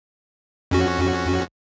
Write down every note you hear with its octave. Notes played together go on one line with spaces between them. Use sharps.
F2 C#4 F#4